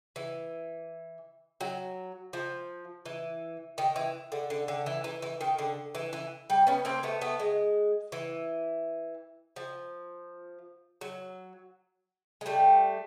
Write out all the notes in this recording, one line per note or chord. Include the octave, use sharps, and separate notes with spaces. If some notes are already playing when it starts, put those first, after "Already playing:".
E3
F#3
F3
E3
D#3
E3
D3
D3
D3
E3
E3
E3
D#3
D3
E3
E3
G3
B3 C#4
A#3 C4
A3 B3
A3 B3
G#3
E3
F3
F#3
G#3
G3 A3